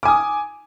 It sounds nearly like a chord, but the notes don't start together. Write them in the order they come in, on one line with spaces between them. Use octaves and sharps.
D6 G#5 D#6